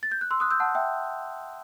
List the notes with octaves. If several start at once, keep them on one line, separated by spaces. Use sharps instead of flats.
A6
G6
F#6
C6 E6
D#6 F#6
E6 G6
F#5 A5
E5 G5